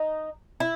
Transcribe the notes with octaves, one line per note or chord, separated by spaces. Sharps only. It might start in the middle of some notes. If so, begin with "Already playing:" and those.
Already playing: D#4
E4